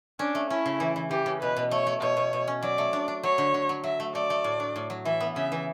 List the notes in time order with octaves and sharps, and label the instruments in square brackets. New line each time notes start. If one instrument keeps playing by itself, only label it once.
[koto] C#4 [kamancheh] D4
[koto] A3
[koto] C#4 [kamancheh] E4
[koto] C#3
E3
E3
[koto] E3 [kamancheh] G4
[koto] C#3
[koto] B2 [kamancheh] B4
[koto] B2
[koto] A3 [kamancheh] C#5
[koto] A3
[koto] B2 [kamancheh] C#5
[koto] B2
B2
C#4
[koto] F#3 [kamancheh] D5
[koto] A3
D4
D4
[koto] F#3 [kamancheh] C#5
[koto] D3
D3
F#3
[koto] F#3 [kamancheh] E5
[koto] A3
[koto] A3 [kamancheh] D5
[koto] A3
A2
D4
A2
F#3
[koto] E3 [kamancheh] E5
[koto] B3
[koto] C#3 [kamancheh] E5
[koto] E3